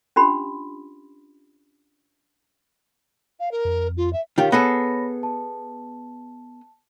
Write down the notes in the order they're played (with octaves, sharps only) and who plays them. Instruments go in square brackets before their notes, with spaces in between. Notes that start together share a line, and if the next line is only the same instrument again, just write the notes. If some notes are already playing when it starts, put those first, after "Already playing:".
[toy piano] C#4 D4 F4 G4 B5 C6
[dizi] F5
A#4
[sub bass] F2
[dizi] F4
E5
[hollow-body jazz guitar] D#3 F4 G4 [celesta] C#5 F5
[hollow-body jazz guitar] B3 G#4 A4 [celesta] C#5 B5 A#6
[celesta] A5